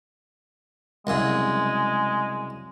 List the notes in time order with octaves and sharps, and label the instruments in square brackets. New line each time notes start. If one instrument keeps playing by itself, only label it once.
[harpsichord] C2 F#2 C#3 [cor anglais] G#3